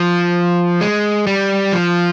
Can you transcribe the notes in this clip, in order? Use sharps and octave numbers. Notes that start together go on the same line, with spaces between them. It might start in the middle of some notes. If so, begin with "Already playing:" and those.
Already playing: F3
G#3
G3
F3